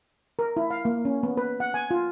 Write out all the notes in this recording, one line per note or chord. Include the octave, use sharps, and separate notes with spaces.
A#4
E4
F5
A#3
C#4
B3
B4
F#5
G#5
F4